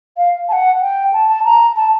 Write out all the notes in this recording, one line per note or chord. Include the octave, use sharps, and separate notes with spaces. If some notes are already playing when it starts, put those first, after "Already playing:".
F5
A5
F#5
G5
A5
A5
A#5
A5